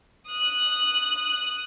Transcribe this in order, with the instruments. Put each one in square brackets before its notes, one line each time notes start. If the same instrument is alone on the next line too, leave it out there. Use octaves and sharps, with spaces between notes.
[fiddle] D#6 F#6